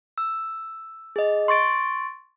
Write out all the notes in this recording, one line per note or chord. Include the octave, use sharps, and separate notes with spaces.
E6
G#4 D#5
C6 C#6 A6 D7